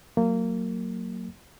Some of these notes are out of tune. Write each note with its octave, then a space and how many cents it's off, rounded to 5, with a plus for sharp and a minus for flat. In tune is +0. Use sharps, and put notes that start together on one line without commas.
F#3 +0 A#3 -20